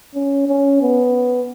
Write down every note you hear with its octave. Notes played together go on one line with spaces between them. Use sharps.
C#4
C#4
B3